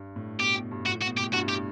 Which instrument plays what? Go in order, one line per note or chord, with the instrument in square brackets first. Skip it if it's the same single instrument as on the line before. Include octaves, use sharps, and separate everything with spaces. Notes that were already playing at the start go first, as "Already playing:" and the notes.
Already playing: [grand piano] G2
A2
[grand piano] B2 [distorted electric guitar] G4
[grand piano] B2
G2
[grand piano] A2 [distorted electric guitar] F#4
[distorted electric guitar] F#4
[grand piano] B2
[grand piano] A2 [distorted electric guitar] G4
[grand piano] G2 [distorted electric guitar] F#4
[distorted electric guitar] G4